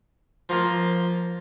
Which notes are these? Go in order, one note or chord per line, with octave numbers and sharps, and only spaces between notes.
F3 A#3 F4